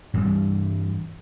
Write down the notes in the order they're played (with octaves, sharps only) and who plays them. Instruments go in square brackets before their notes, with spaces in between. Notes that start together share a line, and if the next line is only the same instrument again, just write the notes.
[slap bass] G2 E3 G3